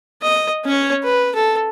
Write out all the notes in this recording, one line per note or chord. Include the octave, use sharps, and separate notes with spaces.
D#5
C#4 C#5
B4
A4